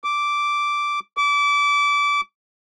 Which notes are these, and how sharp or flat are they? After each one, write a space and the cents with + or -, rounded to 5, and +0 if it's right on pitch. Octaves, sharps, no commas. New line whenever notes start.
D6 -5
D6 -25